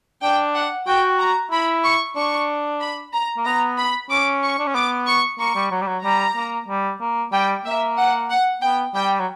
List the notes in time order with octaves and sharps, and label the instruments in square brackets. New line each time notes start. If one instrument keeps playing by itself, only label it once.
[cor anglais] D4 [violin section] G5
[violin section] F#5
[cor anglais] F#4 [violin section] G5
[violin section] A#5
[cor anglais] E4 [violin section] B5
[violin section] C#6
[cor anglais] D4 [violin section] C#6
[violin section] B5
A#5
[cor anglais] A#3
[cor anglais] B3 [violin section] A#5
[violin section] B5
[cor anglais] C#4 [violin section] D6
[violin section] C#6
[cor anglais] D4
C#4
[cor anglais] B3 [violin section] D6
[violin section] C#6
[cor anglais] A#3 [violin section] C#6
[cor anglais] G3
F#3
G3
F#3
[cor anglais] G3 [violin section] A#5
[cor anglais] A#3
G3
A#3
[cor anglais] G3 [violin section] G5
[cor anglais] A#3 [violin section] E5
[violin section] F#5
F#5
[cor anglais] B3 [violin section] G5
[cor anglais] G3 [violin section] G5
[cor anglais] F#3